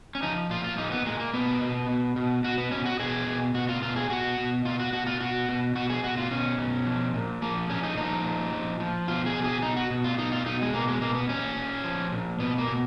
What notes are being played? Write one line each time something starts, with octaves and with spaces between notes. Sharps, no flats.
C#4
F3 D#4
A#2 F4
F4
A#2 D#4
B3
A#2 G#3
A#3
B2 B3
B2
B2
B2
B2 F#4
B3
B2 C#4
F#4
B2 G#4
B2
B2 F#4
F4
B2 F4
G#4
B2 F#4
B2
B2 F4
F#4
B2 F#4
F4
B2 F#4
B2
B2 F#4
G#4
B2 F#4
F4
B2 C#4
B2
F3
A#2
F3 A#3
A#2 C#4
D#4
F3 D#4
A#2
F3
F3
B2 F4
G#4
B2
G#4
B2 D#4
F#4
B2
F4
B2 D#4
F4
B2 D#4
G#3
B2 A#3
G#3
B2 A#3
B3
A#2 C#4
A#2
F3
A#2
B2 B3
A#3
B2